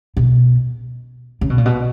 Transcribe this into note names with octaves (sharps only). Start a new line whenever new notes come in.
B2
C#3
B2
A#2
B2